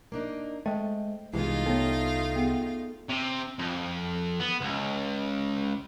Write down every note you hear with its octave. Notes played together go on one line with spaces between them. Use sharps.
A#3 D4 D#4
G#3 A3 C4 G5
C2 E3 G#3 B3 D#4 F4 F5
A3 B3 A4 C#5
B3 G#4 F#5
C3
F2
B3
C#2